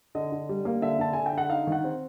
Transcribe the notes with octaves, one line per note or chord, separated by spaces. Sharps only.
D3 D#5
D3
G3
A#3
D3 E5
D3 A5
D3 G#5
G5
D3 F#5
D#4 F5
D#3 F#5
C4